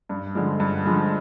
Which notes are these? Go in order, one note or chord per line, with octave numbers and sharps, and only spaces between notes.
G2
D3 F3 G#3
G2
D3 F3 G#3